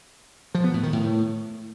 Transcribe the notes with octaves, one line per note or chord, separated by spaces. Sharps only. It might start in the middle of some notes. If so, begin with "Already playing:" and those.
F3
B3
A2
D#3
A2